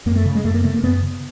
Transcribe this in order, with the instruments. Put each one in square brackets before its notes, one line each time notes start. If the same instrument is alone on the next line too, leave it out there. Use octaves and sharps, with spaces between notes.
[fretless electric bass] F#2 A#3
A3
C#3
G#3
F#2 A3
A#3
C#3 A3
A#3
F#2 B3
C#3